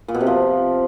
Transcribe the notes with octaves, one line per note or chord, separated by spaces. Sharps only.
A#2
B2
C3
F3